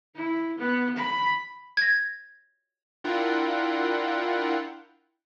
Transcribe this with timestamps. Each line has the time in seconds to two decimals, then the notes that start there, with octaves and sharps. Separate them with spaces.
0.15 E4
0.59 B3
0.97 B5
1.77 G#6 A#6
3.04 D4 E4 F4 A#4 F#5 G5